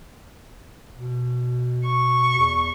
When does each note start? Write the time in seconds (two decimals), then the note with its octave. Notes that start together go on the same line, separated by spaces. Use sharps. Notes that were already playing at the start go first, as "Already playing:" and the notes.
0.95 B2
1.85 C#6
2.38 E2